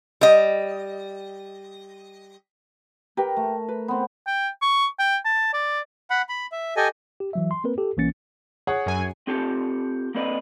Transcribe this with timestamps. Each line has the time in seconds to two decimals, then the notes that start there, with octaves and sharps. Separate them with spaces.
0.21 G3 D#5
3.17 G4 A#4 B4 G5
3.37 A3
3.68 B4
3.88 B3 C4
4.27 G5
4.62 C#6
5.00 G5
5.25 A5
5.54 D5
6.10 F#5 B5
6.29 B5
6.52 E5
6.76 G4 A4 D#5 G#5
7.20 G4
7.33 E3 F#3 E5
7.51 C6
7.64 A#3 C4 A#4 B4
7.78 G4 A4
7.97 B1 E3 A#3 C#4 A6 C#7
8.67 G#4 C#5 F#5
8.86 F#2 G#5
9.27 C4 F4 G4 A4 A5
10.15 A#3 C4 A4 B4 D5 D#5